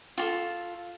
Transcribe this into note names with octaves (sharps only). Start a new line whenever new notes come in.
F4 G4 A4